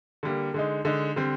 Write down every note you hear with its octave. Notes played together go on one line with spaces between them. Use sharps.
D3 G3 A#3
D3 G#3 D#4
D3 G#3 D#4
D3 G3 C4